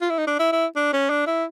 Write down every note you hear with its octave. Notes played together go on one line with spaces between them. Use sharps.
F4
E4
D#4
D4
E4
E4
D4
C#4
D4
E4